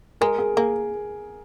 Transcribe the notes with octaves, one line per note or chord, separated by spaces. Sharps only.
G#3 A#4
G#4
A#3 G#4